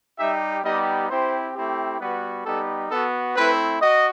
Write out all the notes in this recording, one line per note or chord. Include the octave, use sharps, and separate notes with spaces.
G3 D#4 G4 E5
G3 B3 D#4 G4 D#5
C4 E4 G4 C5
A3 C4 E4 G4
G3 B3 F#4 B4
G3 B3 D#4 G4 A4
B3 F#4 A4
A3 C4 E4 B4
F#4 D#5